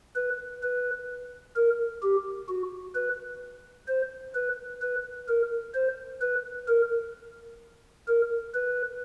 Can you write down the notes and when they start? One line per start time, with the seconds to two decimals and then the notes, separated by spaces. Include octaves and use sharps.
0.16 B4
0.63 B4
1.56 A#4
2.02 G4
2.48 F#4
2.95 B4
3.88 C5
4.35 B4
4.82 B4
5.28 A#4
5.74 C5
6.21 B4
6.68 A#4
8.08 A#4
8.54 B4